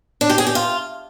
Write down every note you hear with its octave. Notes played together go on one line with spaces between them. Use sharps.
D4
G4
G#4
G4
F4